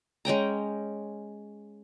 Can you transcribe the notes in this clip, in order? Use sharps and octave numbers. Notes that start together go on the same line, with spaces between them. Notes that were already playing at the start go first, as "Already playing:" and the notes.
G#3 C#4 G5 A#5